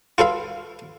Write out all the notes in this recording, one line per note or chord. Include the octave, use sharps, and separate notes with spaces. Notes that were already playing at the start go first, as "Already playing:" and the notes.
F4 A4 B4 F5